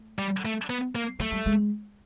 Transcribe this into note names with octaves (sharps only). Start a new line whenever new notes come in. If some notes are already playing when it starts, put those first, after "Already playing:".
Already playing: A3
G3
A3
B3
A#3
F#3 A3
G3
G#3